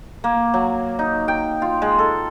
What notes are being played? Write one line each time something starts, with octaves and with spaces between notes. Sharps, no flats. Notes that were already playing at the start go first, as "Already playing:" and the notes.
A#3
F#3
D#4
G5
F4
G#3
A4